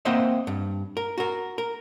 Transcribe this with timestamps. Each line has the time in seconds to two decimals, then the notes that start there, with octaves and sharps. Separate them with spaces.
0.05 A#3 C4 C5 D#5 E5 F#5
0.47 G2
0.97 A#4
1.18 F#4 A#4
1.58 A#4